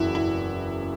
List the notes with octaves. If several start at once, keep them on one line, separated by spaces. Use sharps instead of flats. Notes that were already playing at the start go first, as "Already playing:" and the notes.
Already playing: F#1 E2 C#3 E4 F#4
E4